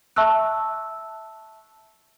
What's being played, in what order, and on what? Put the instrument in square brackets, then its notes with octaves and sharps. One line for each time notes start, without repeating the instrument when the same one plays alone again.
[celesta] E5 A5 C#6 E6 F#6